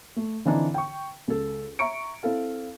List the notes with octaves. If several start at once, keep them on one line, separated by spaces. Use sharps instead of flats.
A3
D3 E3 C4 D4 D#4
G5 C#6
C#2 A4
E5 A#5 C#6 C#7 D7
C4 E4 A4 F5